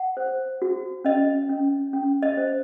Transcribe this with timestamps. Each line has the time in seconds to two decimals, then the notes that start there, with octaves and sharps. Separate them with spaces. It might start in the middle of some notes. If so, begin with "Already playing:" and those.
Already playing: F#5
0.17 C5
0.62 F#4
1.04 C#4 D#5
1.50 C#4
1.93 C#4
2.23 D#5
2.37 C5